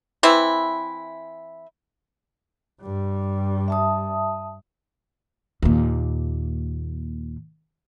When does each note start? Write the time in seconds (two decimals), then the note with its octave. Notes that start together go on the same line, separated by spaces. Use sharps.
0.23 E3 C4 E4
2.82 G2 G3
3.68 E5 A5 D#6
5.62 D#2 A#2